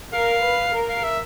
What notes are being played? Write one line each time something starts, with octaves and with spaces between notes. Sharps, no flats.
A#4 F5
B4
A#4
F5
E5